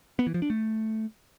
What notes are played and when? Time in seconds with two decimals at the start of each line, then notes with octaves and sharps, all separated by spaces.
0.19 B3
0.27 E3
0.34 F3
0.42 D4
0.50 A3